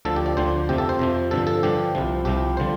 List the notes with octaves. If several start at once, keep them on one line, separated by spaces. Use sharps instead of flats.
D2 D3 F3 A4
G4
D5
D2 D3 F3 C5
F2 C3 F3 G4
A4
C5
F2 C3 F3
G2 D3 F3 A4
A4
G2 D3 F3 G4
C2 C3 F3
C2 C3 F3 G4
D3 F3 C5